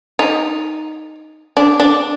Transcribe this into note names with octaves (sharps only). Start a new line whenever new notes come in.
D#4
D4
D4